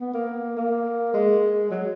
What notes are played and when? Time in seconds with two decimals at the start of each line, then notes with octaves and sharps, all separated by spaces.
0.01 B3
0.14 A#3
0.57 A#3
1.14 G#3
1.71 F#3